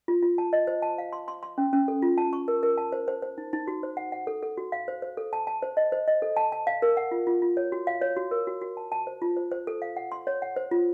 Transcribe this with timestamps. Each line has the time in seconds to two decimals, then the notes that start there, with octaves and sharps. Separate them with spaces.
0.08 F4
0.23 F4
0.38 A5
0.53 D#5
0.67 C5
0.82 A5
0.98 F5
1.13 C6
1.28 C6
1.43 C6
1.58 C#4
1.73 C#4
1.88 A4
2.02 F4
2.18 A5
2.33 C#6
2.48 A#4
2.63 A#4
2.78 A5
2.92 C5
3.08 C5
3.22 C5
3.38 D#4
3.53 D#4
3.68 F#4
3.83 C5
3.97 F#5
4.12 F#5
4.27 A4
4.43 A4
4.57 F#4
4.72 F5
4.88 C5
5.02 C5
5.17 A4
5.33 A5
5.47 A5
5.62 C5
5.77 D#5
5.92 C5
6.08 D#5
6.22 A4
6.37 A5
6.52 A5
6.67 F5
6.82 A#4
6.97 F#5
7.11 F4
7.27 F4
7.42 F4
7.57 C#5
7.72 F#4
7.87 F5
8.02 C#5
8.16 F#4
8.31 A#4
8.47 F#4
8.61 F#4
8.77 A5
8.92 A5
9.07 C5
9.22 F4
9.37 C5
9.51 C5
9.67 A4
9.82 F5
9.97 F#5
10.12 C6
10.27 C#5
10.42 F#5
10.56 C5
10.71 F4